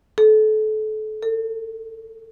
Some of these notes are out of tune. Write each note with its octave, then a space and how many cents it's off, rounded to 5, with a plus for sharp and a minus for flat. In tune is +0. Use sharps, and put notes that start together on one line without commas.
A4 -30
A4 +35